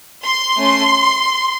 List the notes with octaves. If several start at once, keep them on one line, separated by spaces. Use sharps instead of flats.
C6
A3 C#4